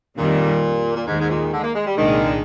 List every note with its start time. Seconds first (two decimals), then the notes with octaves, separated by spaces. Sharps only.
0.17 F2 A#2 D#3 G3
0.96 A#2
1.07 D#2 G#2 D#3 G#3
1.21 G#2
1.30 A#2
1.43 D#3
1.52 D3
1.58 G#3
1.63 A#3
1.74 G#3
1.86 G3
1.96 C2 A#2 D#3 G#3 D4